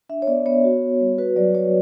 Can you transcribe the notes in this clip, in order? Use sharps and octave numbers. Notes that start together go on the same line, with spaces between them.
D4 E5
C#5
B3 D5
B3 C#5
F#4
F#4
G3
F#4 B4
F#3 D5
F#4 C#5